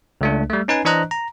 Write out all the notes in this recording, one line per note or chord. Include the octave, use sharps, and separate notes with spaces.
C#2 A3 D4
G3 A3
C#4 D#4 B4 G#5
E3 D4 C5 D#5 A#5 F#6
A#5